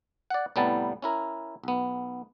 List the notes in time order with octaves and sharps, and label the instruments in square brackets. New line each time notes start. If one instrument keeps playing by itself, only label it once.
[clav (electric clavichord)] D5 F#5
C2 A2 G3 B3 A5
C#4 E4 A#4
B1 B3